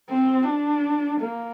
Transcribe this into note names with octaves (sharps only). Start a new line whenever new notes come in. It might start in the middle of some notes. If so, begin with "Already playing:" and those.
C4
D4
A#3